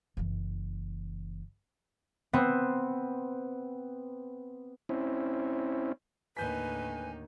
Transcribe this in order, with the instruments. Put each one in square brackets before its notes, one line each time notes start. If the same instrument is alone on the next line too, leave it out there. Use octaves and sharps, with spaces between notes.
[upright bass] F#1 E3
[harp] B3 C4
[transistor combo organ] C4 C#4 E4
[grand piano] D#2 G6 B6 [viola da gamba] A2 D3 D#4 [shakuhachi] B4 [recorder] G#5